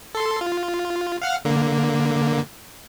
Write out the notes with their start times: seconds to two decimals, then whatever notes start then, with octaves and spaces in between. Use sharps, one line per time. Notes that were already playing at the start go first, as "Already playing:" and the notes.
0.15 A4 C6
0.41 F4
1.22 F5 F#5 F6
1.45 D3 A#3